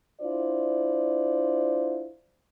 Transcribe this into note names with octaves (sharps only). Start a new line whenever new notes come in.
D4 E4 F4 C5 D5